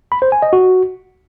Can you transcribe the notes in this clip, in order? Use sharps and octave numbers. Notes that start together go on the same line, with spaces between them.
B5
C5
G#5
D#5
F#4